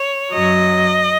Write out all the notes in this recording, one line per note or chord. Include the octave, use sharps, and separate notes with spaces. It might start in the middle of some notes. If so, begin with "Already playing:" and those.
Already playing: C#5
F#2 F#3 D#5